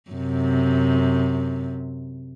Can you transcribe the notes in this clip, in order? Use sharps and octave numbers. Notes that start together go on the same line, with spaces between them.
F#2 C3